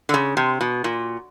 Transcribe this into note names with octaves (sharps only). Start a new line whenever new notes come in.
D3
C#3
C3
B2
A#2